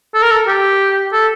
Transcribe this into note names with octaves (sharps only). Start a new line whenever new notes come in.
A4
A#4
A4
G4
A4